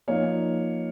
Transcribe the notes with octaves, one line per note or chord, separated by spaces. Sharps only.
F3 A#3 D#4 C#5